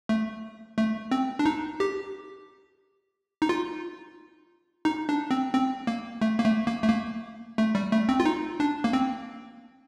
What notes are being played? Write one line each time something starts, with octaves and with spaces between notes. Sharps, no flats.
A3
A3
C4
D4
D#4
G4
D#4
F4
D#4
D4
C4
C4
A#3
A3
A#3
A3
A#3
A3
A#3
A3
G3
A3
C4
F4
D#4
D4
A#3
C4